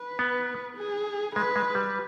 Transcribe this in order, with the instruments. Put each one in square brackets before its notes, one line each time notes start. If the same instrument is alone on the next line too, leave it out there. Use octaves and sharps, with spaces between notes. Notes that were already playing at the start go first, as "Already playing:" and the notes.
Already playing: [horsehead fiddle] B4
[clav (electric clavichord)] B3
[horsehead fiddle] G#4
[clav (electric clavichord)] G#3 [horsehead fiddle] B4
[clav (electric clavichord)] G#3
G3